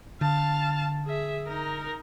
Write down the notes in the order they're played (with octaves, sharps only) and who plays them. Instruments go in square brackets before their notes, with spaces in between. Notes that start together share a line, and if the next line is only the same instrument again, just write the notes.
[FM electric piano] D3 [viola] F5 A5
[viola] G#4 E5
D#4 A#4